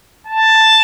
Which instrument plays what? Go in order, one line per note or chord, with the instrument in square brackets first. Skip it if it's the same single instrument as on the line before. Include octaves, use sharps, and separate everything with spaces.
[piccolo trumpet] A5